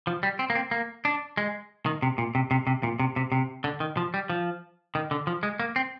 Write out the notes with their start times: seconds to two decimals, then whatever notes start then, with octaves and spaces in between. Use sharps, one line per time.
0.07 F3
0.23 G3
0.39 C4
0.50 A#3
0.55 C4
0.71 A#3
1.05 D4
1.37 G#3
1.86 D#3
2.02 C3
2.18 A#2
2.35 C3
2.51 C3
2.67 C3
2.83 A#2
3.00 C3
3.16 C3
3.32 C3
3.64 D3
3.80 D#3
3.97 F3
4.14 G3
4.30 F3
4.95 D#3
5.11 D3
5.27 F3
5.43 G#3
5.60 A#3
5.76 C4